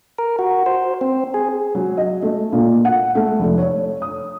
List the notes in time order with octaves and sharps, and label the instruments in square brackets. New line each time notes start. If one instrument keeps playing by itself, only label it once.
[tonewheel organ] A#4
F#4
C5
C4
G#4
[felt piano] F#3
D#5
A3
A#2
F#5
A3
F1
C#5
D#6